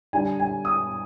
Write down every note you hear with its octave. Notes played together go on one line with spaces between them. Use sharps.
D3 G3 D4 G#5
G#5
D#6